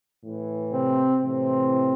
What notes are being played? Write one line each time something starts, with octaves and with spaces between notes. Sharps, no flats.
A2 E3
C3 C4
A2 C3 E3 C4